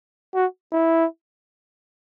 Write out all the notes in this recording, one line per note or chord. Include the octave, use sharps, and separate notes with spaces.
F#4
E4